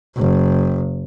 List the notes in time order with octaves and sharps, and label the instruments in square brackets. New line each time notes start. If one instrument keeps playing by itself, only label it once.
[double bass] F#1